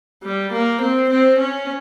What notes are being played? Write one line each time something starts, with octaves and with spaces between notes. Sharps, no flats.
G3
A#3
C4
C4
C#4